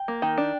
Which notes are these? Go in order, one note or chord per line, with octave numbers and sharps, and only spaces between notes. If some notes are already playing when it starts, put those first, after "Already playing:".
Already playing: G5
A#3
D#3 G5
D4